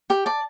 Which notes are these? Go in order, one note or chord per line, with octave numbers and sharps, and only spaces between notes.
G4 G5
D5 A5